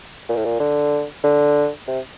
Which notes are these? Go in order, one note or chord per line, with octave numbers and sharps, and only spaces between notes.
A#2
A2
A#2
D3
D3
C3